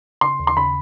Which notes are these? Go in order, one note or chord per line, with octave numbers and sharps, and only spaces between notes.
C#3 C6
D#2
C6
C#3 B5